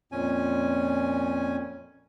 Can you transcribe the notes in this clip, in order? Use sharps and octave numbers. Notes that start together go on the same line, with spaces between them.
F2 A#2 C#4 G#5